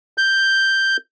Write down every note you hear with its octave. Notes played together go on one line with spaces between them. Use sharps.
G6